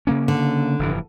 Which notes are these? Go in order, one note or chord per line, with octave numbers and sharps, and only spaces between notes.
C#3 A#3 C#4
D3
F1 G2 E3